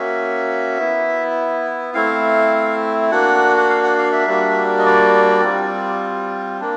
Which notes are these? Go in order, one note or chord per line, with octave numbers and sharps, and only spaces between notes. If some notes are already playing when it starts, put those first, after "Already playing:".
Already playing: A#3 C#4 F#4 E5
B3 E4
A3 C4 E4 F5
A#3 D4 F#4 F#5
F#5
F5
F#5
F5
E5
G3 A#3 D4 F#4
D#5
D5
G3 C4 F4
A#3 D4